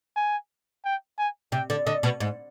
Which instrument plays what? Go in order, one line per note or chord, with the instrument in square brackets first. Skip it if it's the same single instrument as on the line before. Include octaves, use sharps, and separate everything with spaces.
[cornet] G#5
G5
G#5
[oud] C3 [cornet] G5
[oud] D3
[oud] D3 [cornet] D#5
[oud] B2
G#2